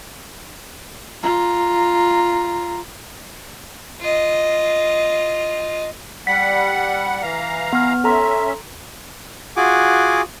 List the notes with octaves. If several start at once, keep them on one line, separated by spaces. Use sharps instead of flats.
F4 A#5
F4 D#5
G3 F#5 B6
E3 F5 A#5
B3 F6
C#4 A4 E5 A#5 C6
F4 F#4 G#4 F#5 G#5 D6